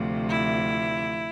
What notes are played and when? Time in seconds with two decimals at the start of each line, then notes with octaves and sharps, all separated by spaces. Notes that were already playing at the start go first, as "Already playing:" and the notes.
Already playing: D2 C3 F3
0.30 E4